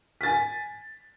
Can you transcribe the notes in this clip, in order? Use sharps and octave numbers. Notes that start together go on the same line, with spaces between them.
G#5 A6 B6